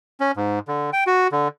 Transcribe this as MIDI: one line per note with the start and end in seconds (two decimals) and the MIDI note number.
0.20 0.32 61
0.37 0.59 44
0.68 0.90 50
0.93 1.04 79
1.07 1.28 66
1.32 1.48 50